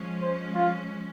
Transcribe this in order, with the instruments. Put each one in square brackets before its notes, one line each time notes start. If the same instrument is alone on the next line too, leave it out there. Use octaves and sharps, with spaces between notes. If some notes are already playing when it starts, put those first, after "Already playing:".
Already playing: [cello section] F3 G#3 C#4
[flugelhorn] C5
F4